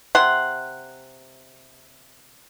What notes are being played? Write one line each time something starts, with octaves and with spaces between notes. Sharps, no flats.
C3 F#5 C6